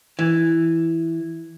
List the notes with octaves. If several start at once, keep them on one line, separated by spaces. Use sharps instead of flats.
E3